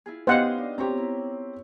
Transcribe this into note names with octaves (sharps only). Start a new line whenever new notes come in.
E4 F4 G#4
B3 C#4 D#4 G4 C5 D#5 F5 F#5
D4
C4 F4 G4 C#5 A#5
E4